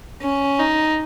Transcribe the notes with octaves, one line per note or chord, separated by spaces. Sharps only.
C#4
D#4